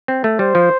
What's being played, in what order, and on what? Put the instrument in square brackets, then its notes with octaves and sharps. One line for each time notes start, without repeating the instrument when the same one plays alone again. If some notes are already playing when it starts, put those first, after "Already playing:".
[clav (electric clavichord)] C4
A3
[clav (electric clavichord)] G3 [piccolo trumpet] C5
[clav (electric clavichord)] F3